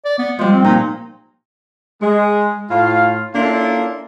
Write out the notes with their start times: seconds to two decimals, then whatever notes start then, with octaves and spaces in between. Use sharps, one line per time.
0.05 D5
0.18 B3
0.39 F3 G3 G#3
0.52 C4
0.64 A#2 D#4
2.01 G#3
2.71 A2 F4 F5
3.35 A#3 C#4 D4 E4 F4 A4